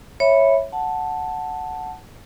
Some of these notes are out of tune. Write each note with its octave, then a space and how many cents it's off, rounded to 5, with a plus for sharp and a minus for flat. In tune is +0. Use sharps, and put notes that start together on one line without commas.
C#5 -10 E5 +0 B5 +0
F#5 +0 A5 +0